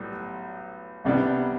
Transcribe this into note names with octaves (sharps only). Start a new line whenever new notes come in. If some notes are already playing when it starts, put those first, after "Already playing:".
Already playing: B1 A2 G3
C2 C3 G3 B3 D4